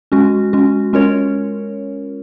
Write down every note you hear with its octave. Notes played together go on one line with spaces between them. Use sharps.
G#3 C#4 F#4
G#3 C#4 F#4
G#3 C#4 F4 A#4 C#5